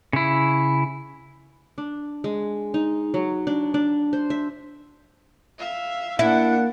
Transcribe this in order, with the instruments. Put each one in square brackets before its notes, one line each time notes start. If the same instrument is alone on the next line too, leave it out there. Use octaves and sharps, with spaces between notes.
[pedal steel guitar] C#3 E4
[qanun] D4
G#3
D#4
F#3
D4
D4
C5
E5
[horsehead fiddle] E5 F5
[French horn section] A#3 [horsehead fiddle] D4 F#5 [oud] E4